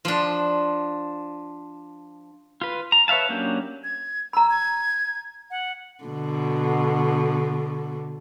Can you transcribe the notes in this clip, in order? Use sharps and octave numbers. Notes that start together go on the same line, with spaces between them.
F3 D4
F4 B4
A#5
B4 C#5 E5 F5 A5
F#3 A#3 C#4 D4 G4
G#6
A#5 B5 E6
G#6
F#5
B2 D3